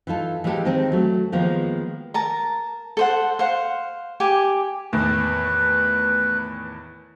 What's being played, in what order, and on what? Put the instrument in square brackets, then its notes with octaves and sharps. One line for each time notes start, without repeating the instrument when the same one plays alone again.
[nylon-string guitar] E3 D#4 F4 A4
E3 G#3 A#3 D4 G4 A4
D#3 G#3 C4
F#3 A3
D#3 F3 G#3 A#3 B3 D#4
[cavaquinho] A#4 A5 A#5
A4 C5 F#5
C5 F5 F#5
G4 G#5 D6
[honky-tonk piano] E2 A2 D#3 [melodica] B4